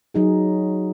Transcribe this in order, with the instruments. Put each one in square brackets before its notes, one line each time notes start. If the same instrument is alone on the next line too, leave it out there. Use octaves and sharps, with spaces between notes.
[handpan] F#3 D#4 G#4